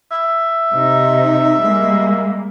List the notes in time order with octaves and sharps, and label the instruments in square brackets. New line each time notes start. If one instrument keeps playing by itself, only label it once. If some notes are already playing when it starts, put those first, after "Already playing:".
[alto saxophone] E5
[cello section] C3 D#4
G3 G#3 A#3